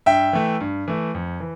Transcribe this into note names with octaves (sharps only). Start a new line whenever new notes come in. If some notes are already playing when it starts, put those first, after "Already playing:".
G2 E5 G5
E3 A3
G2
E3 A3
F2
E3